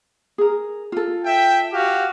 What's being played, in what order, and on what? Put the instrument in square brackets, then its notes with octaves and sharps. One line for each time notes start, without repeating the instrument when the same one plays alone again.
[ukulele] G#4 A#4
F4 A4
[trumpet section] E5 G5
F#4 G4 F5